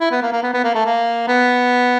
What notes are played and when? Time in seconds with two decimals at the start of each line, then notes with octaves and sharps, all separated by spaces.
0.01 E4
0.11 B3
0.22 A#3
0.33 A#3
0.43 B3
0.54 B3
0.64 A#3
0.75 A3
0.86 A#3
1.28 B3